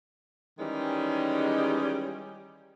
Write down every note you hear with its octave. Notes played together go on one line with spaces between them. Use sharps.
D#3 E3 G3 G#3 C#4 D#4